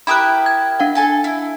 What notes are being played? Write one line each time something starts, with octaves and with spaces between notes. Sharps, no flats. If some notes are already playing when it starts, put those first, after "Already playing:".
E4 G4 A#4 B5 D#6 F#6
G#6
D4 F5 F#5
A4 G#5 A5
E4